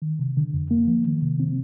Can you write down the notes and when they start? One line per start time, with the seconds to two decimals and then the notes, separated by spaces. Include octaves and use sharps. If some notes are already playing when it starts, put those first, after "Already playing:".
0.02 D#3
0.19 C3
0.37 D3
0.54 F2
0.71 A#3
0.87 F3
1.05 D#3
1.21 C3
1.40 C4